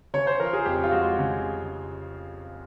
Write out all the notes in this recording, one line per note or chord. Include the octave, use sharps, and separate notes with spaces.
C#3 C#5
C5
F3 A#4
G#4
F2 G4
F4
G#3 F#4
C#3